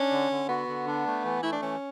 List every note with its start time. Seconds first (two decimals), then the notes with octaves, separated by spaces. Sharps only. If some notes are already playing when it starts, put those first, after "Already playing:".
Already playing: C#4 D4
0.11 D3
0.31 D3
0.49 B3 F#4
0.68 D3
0.87 D4
1.06 A3
1.25 E3
1.43 A3 E4
1.53 D4
1.62 E3 C#4